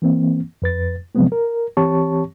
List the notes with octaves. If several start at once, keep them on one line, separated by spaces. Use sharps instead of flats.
E3 A#3 C4
F2 B4 A6
C3 F3 F#3 G#3 B3 C4
A#4
E3 C4 G4 C#5 A5 C#6